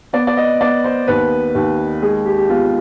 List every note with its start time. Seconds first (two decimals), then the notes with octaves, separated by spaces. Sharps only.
0.13 B3 D5
0.27 D5
0.37 D#5
0.61 B3 D5
0.84 C5
1.07 D#2 B4
1.55 D#2
2.02 G#3 G#4
2.25 G4
2.38 G4
2.49 B3 F4